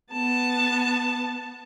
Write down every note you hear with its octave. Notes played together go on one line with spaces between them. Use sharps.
B3 A5